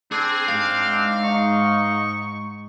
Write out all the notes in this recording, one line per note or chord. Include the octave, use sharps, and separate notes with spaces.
C4 D4 G#4
G#2 F5
D#4 C#6